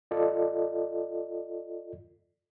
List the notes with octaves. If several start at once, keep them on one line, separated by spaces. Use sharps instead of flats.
F4 A4 D5 D#5